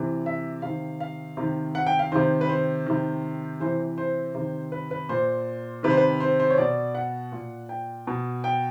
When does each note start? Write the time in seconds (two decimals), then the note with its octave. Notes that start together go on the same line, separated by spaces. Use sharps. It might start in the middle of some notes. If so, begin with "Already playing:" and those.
Already playing: C3 E3
0.26 E5
0.62 C3 D#3 F5
1.00 F5
1.37 C3 D#3
1.75 F#5
1.87 G5
1.99 F5
2.12 C3 D#3 C5
2.41 B4
2.49 C5
2.86 C3 D#3
3.60 C3 E3 C5
3.98 C5
4.35 C3 D#3
4.72 B4
4.91 B4
5.09 A#2 C5
5.83 C3 D#3 B4
5.90 C5
5.97 B4
6.20 C5
6.40 C5
6.50 C#5
6.58 B2 D5
6.95 F#5
7.32 A#2
7.69 G5
8.07 B2
8.44 G5